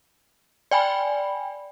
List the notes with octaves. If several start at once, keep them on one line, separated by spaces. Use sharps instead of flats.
D5 G5 G#5 B5